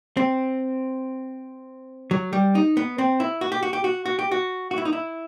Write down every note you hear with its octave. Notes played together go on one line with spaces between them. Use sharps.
C4
F#3
G3
D#4
B3
C4
E4
F#4
G4
F#4
G4
F#4
F#4
G4
F#4
F#4
E4
D#4
E4